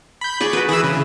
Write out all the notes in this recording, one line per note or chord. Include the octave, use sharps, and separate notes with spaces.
B5 G6
G#4 D5 C#6
F#4 B4
E3 G#4 B5 E6
C#3